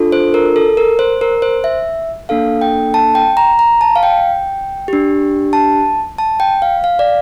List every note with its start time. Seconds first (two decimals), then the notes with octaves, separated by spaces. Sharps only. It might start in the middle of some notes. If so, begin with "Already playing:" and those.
Already playing: D4 F4 A4
0.12 C5
0.34 A#4
0.56 A4
0.77 A#4
0.99 C5
1.21 A#4
1.42 C5
1.64 E5
2.29 A#3 D4 A4 F5
2.61 G5
2.94 A5
3.15 G5
3.37 A#5
3.59 A#5
3.81 A5
3.96 F5
4.03 G5
4.88 D4 G4
5.53 A5
6.18 A5
6.40 G5
6.62 F5
6.84 F5
6.99 D5